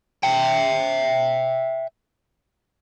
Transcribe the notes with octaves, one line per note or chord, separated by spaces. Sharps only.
E5 G5